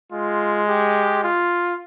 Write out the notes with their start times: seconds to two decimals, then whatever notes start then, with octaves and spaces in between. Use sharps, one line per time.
0.12 G#3 F4
0.69 G4
1.24 F4